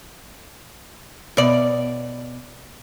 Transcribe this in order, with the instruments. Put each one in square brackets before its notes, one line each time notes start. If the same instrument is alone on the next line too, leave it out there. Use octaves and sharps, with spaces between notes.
[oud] B2 D5